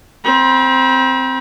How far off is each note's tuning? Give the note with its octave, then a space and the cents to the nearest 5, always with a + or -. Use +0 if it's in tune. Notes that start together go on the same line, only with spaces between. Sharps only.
C4 +0 B5 -45